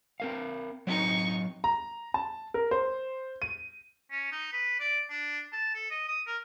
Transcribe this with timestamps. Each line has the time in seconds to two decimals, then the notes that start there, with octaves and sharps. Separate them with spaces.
0.20 C4 A#4 F5
0.87 F#3 C4 D#4 B4 C#6
1.64 A#5
2.14 A5
2.54 A#4
2.71 C5
3.42 D#7
4.11 C#4
4.32 D#4
4.52 B4
4.80 D5
5.10 D4
5.53 A5
5.75 A4
5.91 D#5
6.08 D#6
6.27 A#4